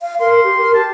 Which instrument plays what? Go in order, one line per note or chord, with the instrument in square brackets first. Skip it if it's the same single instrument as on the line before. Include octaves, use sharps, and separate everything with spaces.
[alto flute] F5
[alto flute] A#4 [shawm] C6
[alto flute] G4
A#4
[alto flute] G4 [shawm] A5